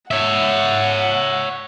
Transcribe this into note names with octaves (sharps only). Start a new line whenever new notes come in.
C#5 E5 F#5